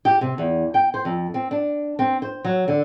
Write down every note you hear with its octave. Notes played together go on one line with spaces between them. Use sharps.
G4
C3
E2
G5
C5
F2
C4
D4
C4
C5
F#3
D3